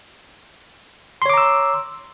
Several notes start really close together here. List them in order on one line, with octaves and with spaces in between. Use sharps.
C6 C#5 D6 A#5 E6